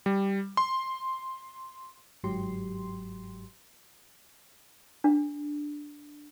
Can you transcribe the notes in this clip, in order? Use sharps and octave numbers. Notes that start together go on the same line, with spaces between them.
G3
C6
G1 G#2 F#3 G4 C6
D4